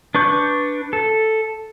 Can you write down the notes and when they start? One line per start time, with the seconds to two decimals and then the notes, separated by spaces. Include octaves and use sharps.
0.15 D4 B4 C#6 G6
0.93 A4